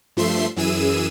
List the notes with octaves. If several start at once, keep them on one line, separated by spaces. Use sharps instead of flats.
G2 F3 A3 E5 C6 C7
F#2 E3 G#4 E6 D#7